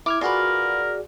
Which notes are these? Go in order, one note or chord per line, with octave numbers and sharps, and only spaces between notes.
E4 D6 F6 G#6
F4 F#4 G#4 A#4 B4 D5